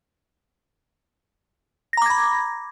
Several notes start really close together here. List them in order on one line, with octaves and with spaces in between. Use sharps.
A#6 A#5 D6 G#6 B5